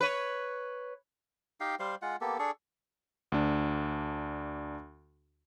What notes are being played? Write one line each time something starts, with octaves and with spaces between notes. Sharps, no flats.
B4 C#5
D#4 G4 F5 G5
G3 C5 F5 C6
G#3 F4 F#5
A#3 B3 G4 A4
D4 G#4 A4 C#6
D2 D4